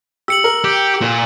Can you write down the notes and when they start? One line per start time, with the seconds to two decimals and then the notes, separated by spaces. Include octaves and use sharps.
0.28 G4 E6 C#7 F#7
0.44 A#4
0.64 G4
1.01 A#2